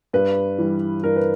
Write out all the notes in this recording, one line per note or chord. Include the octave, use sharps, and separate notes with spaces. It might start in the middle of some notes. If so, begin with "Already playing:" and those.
G2 B4
E3 G3
G2 A#4
B4